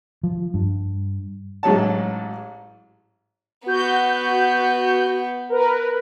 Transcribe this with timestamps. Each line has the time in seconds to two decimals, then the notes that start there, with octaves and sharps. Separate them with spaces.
0.23 F3
0.54 G2
1.63 A1 G#2 F#3 C#5 A5
3.66 B3 F#4 G6
5.50 A#4 B4